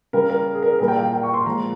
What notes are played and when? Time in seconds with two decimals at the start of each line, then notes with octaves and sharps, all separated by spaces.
0.13 C#3 G3 A#4
0.30 A#4
0.55 G#4
0.63 A#4
0.71 G#4
0.79 A#2 G3 A#4
0.88 G5
0.97 F5
1.13 G5
1.23 C#6
1.34 C6
1.46 A#2 F3 G#3 A#5